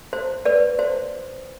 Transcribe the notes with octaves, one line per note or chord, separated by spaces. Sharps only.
C5
B4 D5
C5